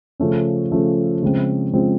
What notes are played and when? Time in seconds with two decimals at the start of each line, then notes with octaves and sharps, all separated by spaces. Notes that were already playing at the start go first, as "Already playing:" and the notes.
0.20 C#3 F3 A3 C#4
0.72 C#3 F3 A3 C#4
1.22 C#3 F3 G#3 C4
1.73 C#3 F3 G#3 C4